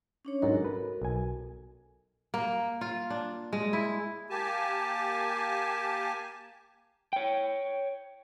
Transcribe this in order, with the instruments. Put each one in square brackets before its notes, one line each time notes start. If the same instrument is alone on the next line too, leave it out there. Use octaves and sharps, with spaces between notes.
[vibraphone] C#4 D4 C#5
[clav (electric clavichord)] G#2 F#3 D#4 [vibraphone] F#4 A4 A#4
[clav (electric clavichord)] B4
B1 G#5
[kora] A#3
F4
D4
G#3
E4
[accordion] A#3 G4 G#5 A5
[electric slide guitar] C#5 G5